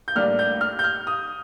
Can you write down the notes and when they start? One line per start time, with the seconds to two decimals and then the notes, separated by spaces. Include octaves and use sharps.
0.08 G6
0.16 A2 G3 A#3 D4 F6
0.39 G6
0.61 F6
0.79 G6
0.84 F6
1.07 D#6